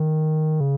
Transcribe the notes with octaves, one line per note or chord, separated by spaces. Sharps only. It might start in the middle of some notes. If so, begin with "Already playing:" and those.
Already playing: D#3
C#3